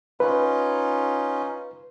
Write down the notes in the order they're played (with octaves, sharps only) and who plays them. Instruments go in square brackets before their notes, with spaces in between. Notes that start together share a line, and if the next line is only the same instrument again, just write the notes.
[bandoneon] C#4 D#4 F4 [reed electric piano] B4